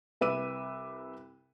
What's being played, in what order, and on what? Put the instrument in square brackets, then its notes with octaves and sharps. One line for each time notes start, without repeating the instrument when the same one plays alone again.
[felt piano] C2 B4 E5 D6 E6 D#7